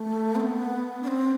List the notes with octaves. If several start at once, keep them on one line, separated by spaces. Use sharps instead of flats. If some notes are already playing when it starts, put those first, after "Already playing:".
Already playing: A3
C4
B3
D4
C4